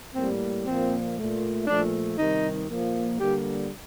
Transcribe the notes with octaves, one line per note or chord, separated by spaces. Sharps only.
A2 G3 A#3 C4
A#2 F3 A#3 C4
A#2 A3
A#2 F3 A3 D4
C3 D#3 G3 D#4
A#2 F3 A#3
D3 G3 A#3 G4